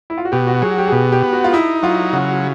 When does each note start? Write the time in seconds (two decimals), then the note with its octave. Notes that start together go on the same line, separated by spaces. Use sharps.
0.10 E4
0.18 F4
0.25 F#4
0.32 B2 G4
0.47 F#4
0.62 F#3 G#4
0.78 G4
0.87 G#4
0.92 B2 G4
1.12 G4
1.23 B3
1.33 F#4
1.44 F4
1.53 D#4 E4
1.83 F#3 F4
2.13 C#3 F#4